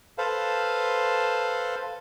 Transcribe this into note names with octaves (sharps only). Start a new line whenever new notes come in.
A4 B4 C5 F5